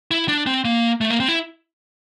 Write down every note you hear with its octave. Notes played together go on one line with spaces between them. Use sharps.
E4
D4
C4
A#3
A3
A#3
C4
E4